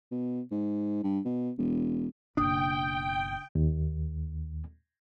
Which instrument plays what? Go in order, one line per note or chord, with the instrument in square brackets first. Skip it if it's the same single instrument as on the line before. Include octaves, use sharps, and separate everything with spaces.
[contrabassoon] B2
G#2
G2
B2
E1
[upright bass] F#1 B2 [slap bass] D4 [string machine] G5 [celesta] D#6
[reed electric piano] D#2